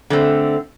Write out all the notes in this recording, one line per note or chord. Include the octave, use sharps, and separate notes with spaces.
D3 A3 C4